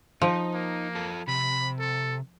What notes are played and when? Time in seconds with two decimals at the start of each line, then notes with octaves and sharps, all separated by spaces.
0.22 F3 D#4
0.54 A#3
0.95 F4 A4
1.28 C3 B5
1.79 A4